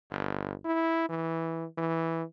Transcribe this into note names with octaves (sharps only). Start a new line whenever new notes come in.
G1
E4
E3
E3